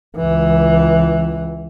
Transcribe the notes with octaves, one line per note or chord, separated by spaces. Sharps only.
C#2 E3